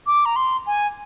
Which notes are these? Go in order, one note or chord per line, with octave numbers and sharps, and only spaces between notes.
D6
A#5
C6
G#5